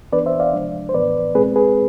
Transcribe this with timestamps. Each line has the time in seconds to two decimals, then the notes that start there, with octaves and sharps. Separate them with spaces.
0.12 E3 B3 D4 B4 D5
0.26 C5 E5
0.40 D5 F5
0.53 C3 F3 G#3 D4
0.89 C5
0.94 A2 E3 B3 B4 D5
1.35 B2 G#3 C4 G#4 B4
1.56 G#4 B4